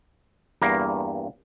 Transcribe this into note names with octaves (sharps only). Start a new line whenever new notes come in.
E2 G2 A#3